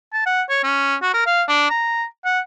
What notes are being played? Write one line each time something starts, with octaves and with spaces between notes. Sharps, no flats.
A5
F#5
C#5
C#4
F#4
A#4
F5
D4
A#5
F#5